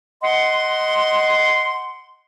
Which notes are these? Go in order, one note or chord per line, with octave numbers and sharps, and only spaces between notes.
D#5 F#5 C6